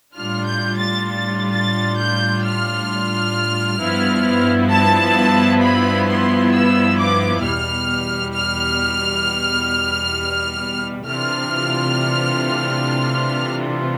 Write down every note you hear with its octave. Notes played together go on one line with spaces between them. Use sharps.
A2 G3 D4 F4 F6
G6
A6
A6
A6
G6
F6
G2 F3 B3 E4
A5
B5
C6
E6
D6
E2 B2 G3 F6
F6
C3 E3 A3 D4 F4 F6